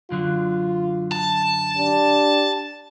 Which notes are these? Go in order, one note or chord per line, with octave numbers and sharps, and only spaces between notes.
F#2 D3 F#3 F4
A5
D4 G4